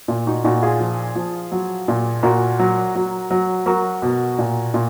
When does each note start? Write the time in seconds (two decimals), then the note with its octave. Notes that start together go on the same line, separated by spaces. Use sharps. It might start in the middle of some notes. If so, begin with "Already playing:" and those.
0.08 A#2
0.26 D#4 F#4
0.44 A#2 D#4 F#4
0.62 F4 G#4
0.80 F3
1.15 F3
1.52 F#3
1.88 A#2
2.23 A#2 F#4 A#4
2.59 F#3
2.95 F#3
3.31 F#3
3.66 F#3 F#4 A#4
4.02 B2
4.38 A#2
4.74 A#2